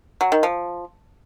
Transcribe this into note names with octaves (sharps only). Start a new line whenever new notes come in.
F#3
D#3
F3